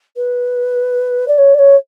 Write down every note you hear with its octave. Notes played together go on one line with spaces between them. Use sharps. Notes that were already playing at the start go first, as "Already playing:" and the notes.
B4
D5
C#5
D5
C#5